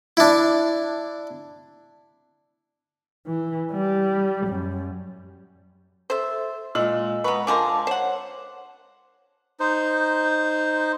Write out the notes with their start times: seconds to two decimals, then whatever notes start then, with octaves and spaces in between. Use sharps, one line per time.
0.17 D4 E4
3.27 E3
3.72 G3
4.47 F#2
6.10 A4 C5 E5
6.75 A#2 G#3 D#5 E6 F#7
7.24 B3 B4 A#5 B5 C#6
7.47 D3 F3 A#4 G#5 A5 C6 D6
7.87 C5 C#5 F#5
9.60 D#4 C5